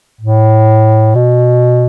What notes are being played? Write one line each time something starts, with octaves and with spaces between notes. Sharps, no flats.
A2
B2